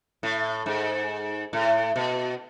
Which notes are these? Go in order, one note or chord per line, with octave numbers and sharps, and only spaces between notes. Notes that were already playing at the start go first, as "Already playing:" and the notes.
A2
G#2
A2
B2